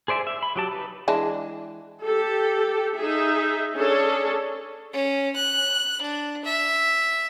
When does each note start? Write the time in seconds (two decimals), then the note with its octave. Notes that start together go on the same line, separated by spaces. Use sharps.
0.08 G#4 C5 D5 E5 G#5
0.27 E5
0.43 B5
0.56 F#3 G4 A5
0.72 D#4 B4
1.08 E3 G#3 D4
2.04 G4 A4
2.96 D#4 G#4 E5
3.76 C#4 D4 G#4 A4 C#5
4.93 C#4
5.36 F#6
6.01 D4
6.45 E5